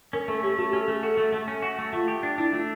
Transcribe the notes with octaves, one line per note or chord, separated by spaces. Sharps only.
C#4 A#4
A3 A4
C#4 G4
A3 F#4
G4
C#4
A4
A3 G#4
F#4 A4
A3
A3
C#4
F#4
A3
A3 F4
G4
D4
D4 E4
A3 F4